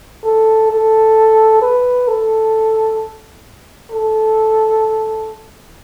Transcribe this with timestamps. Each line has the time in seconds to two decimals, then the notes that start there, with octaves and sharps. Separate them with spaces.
0.24 A4
0.71 A4
1.62 B4
2.08 A4
3.92 A4